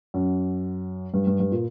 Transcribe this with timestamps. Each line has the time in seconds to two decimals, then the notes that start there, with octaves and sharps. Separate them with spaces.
0.14 F#2
1.14 G2
1.27 G2
1.40 G2
1.52 A#2